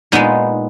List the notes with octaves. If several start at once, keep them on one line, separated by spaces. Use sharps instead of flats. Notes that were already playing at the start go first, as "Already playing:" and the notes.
A#2 G#3 B3 D#4